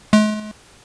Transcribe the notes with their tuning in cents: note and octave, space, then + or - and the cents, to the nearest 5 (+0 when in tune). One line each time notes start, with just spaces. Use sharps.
G#3 +45